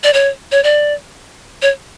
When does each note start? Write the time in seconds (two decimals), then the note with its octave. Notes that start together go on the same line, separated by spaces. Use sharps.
0.04 D5
0.13 C#5
0.52 C#5
0.64 D5
1.62 C#5